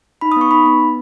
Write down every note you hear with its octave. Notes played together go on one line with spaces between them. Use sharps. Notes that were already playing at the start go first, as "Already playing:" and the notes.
D#4 B5
D#6
B3 C#6
D#4 B5
B3
B3